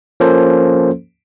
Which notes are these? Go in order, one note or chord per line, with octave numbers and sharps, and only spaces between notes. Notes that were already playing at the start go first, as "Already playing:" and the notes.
F3 A#3 C#4 A4 C5